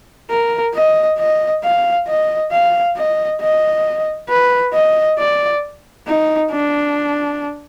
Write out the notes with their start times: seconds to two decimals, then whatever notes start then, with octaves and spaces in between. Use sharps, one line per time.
0.30 A#4
0.75 D#5
1.19 D#5
1.63 F5
2.07 D#5
2.52 F5
2.97 D#5
3.41 D#5
4.29 B4
4.73 D#5
5.19 D5
6.07 D#4
6.51 D4